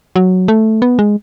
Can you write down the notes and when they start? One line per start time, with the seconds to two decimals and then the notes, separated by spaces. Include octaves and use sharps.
0.16 F#3
0.48 A3
0.82 B3
0.99 G#3